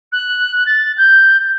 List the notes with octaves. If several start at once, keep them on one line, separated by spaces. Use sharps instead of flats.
F#6
A6
G6